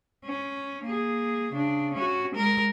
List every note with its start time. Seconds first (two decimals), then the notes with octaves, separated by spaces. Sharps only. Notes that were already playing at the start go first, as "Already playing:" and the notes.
0.25 C#4
0.85 A#3 G#4
1.53 C#3 D4
1.94 C#4 F#4
2.34 G#3 A#4